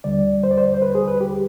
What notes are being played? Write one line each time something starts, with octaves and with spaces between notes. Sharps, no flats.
D#2 D3 G3 D5
C5
D5
C5
C5
B4
G#4
B4
G4